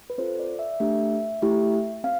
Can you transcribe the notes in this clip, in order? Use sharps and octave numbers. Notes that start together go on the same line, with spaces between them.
B4
C4 F4 A4 C5
D5
E5
A3 D4 G4 E5
A3 E4 G4
C4 F5